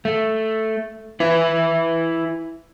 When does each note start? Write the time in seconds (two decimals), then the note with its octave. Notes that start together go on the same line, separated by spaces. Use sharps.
0.05 A3
1.20 E4 B4